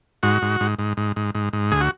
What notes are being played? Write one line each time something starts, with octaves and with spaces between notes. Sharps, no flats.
G#2 F#4
G#2
G#2
G#2
G#2
G#2
G#2
G#2
D2 G#4
F#4